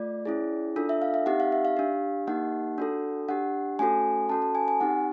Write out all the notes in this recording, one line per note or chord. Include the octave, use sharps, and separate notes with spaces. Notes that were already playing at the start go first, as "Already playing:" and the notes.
Already playing: A3 F4 D5
C#4 E4 G#4
D4 F4 A4
E5
F5
E5
C4 D#4 G4 F#5
F5
E5
F5
D4 G4
A#3 D#4 G4 F#5
D4 F#4 A4
D4 G4 F#5
A3 C#4 F#4 A4 G#5
C#4 F#4 A4 A5
A5
G#5
G#5
C4 D#4 G4 F#5